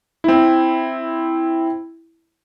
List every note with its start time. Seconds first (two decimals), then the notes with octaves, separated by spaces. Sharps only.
0.24 C4 E4